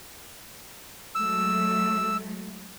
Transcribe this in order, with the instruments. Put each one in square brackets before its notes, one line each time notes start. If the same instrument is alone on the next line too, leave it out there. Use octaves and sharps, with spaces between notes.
[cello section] F#3 G#3 A3 [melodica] E6